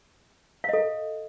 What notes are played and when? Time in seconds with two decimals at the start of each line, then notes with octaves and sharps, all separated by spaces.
0.64 F5
0.69 D#5
0.73 A4